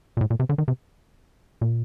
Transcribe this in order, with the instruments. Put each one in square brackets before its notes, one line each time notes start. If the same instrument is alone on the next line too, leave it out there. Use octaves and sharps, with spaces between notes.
[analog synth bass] A#2
A2
A#2
C3
D3
D#3
C3
A#2